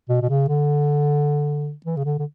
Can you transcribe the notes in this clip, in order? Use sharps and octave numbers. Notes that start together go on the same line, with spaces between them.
B2
B2
C#3
D3
E3
C#3
D3
D3